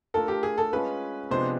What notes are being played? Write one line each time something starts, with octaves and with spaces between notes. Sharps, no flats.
A3 D4 F4 A4 A#4
G4
G#4
A4
G#3 C#4 F4 G#4 B4
C3 F3 G#3 B3 D4 C5